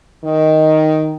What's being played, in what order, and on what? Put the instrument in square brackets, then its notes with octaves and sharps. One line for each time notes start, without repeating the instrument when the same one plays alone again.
[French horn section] D#3